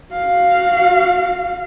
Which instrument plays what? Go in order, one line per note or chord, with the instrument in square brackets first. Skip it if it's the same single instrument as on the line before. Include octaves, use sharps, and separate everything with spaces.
[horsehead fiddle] F#4 F5